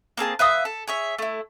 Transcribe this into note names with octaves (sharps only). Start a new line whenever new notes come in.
A#3 C4 G#4 A5
B4 E5 F5 D#6
A4
G#4 C#5 E5
A3 E4